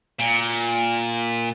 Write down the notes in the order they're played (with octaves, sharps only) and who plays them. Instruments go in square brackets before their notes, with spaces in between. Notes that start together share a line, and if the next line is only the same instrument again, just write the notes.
[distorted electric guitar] A#2